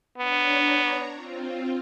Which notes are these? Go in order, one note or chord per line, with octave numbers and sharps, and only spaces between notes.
B3 D4 C#5 A#5
C4 F4